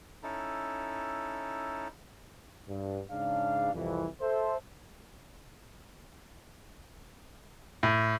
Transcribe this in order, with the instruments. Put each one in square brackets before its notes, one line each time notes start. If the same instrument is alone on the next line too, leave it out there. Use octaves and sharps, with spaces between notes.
[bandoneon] C#4 D#4 E4 A4
[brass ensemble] G2
G#2 C#3 D4 F5
C2 F2 E3
A4 C5 E5
[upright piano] A2